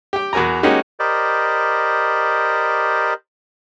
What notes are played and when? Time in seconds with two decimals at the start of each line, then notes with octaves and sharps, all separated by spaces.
0.13 G4 G5
0.33 E2 F#4 A#4 G#5 A#5
0.63 G#3 A#3 C#4 D#4 F#4 G4
1.00 G4 A#4 C5 D5 D#5 B5